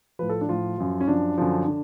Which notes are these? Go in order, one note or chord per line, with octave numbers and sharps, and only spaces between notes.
A2 F3 B4
A4
D4
A2 F3 F4
F#2 F3
C#4
F#2 F3 D4
F#2 D3 F3
D3